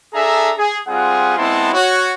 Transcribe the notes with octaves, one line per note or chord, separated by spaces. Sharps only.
D4 G#4 A4 E5 A#5
G#4
G3 C4 F4 G#4 F#5
G#3 B3 C4 E4 A5 C6
F#4 C#5